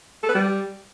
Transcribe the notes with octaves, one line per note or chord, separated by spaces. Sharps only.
A4
B4
G3